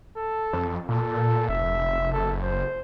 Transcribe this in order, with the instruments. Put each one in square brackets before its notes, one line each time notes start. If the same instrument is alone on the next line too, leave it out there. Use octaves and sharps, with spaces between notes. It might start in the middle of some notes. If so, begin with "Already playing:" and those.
[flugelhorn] A4
[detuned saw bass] F2
[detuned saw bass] A#2 [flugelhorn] A4
[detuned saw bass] F1 [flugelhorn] E5
[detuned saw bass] F#1 [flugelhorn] A4
[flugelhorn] C5